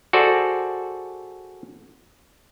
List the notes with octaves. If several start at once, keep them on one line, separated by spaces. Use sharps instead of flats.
F#4 G#4 A4 C5 D5